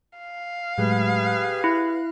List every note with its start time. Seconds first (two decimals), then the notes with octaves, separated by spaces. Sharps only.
0.19 F5
0.78 A2 F#3 G#3 G4 G#4 B4
1.64 E4 F#6